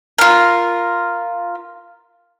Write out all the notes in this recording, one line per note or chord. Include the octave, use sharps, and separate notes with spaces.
F4 A#4